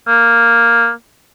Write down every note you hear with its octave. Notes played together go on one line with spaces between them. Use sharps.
A#3